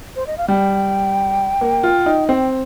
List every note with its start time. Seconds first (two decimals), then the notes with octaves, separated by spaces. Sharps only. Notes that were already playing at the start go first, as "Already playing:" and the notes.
0.16 C5
0.27 D#5
0.38 F5
0.48 G3 G5
1.61 A#3
1.83 F4
2.06 D#4
2.28 C4 G5